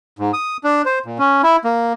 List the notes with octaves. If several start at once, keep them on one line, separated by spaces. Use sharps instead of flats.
G#2
D#6
D4
C5
A#2
C#4
E4
A#3